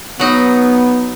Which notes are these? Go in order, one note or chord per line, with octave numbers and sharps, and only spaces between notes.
F#3 B3 D#4